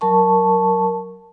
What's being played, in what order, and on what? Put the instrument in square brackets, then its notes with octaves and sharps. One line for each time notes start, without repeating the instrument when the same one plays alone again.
[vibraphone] F#3 A#4 A5 C#6